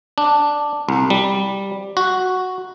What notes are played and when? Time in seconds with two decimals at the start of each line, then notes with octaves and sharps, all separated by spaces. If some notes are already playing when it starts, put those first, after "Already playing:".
0.18 D4
0.89 C2
1.10 G3
1.97 F#4